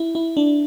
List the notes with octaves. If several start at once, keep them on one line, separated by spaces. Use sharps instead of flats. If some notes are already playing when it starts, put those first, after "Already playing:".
Already playing: E4
E4
D4